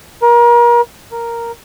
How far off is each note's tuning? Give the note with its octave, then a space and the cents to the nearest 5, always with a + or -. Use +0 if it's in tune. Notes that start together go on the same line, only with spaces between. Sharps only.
A#4 +35
A#4 +0